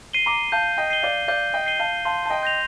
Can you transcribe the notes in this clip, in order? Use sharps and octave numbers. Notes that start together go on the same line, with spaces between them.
C7 D#7 G7
A#5 D6
F5 A5 G6
D#5 G5
C7 D#7 G7
D5 F5
D5 F5 G6
D#5 G5
C7 D#7 G7
F5 A5
F5 A5 C6
A5
D#5 G5
G6 A#6 F7